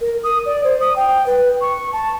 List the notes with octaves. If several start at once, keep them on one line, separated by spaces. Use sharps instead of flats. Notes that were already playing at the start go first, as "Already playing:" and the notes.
A#4
D#6
D5
C5
D#6
G5
B4
C#6
A5